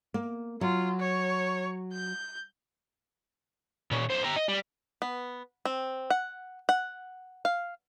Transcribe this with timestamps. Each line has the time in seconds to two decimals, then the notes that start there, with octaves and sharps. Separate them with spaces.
0.14 A#3
0.61 F#3 F4
0.99 C#5
1.92 G6
3.91 A#2 C#4
4.10 B1 C5
4.24 G4 A#5
4.36 D#5
4.49 G3
5.02 B3
5.65 C4
6.10 F#5
6.69 F#5
7.45 F5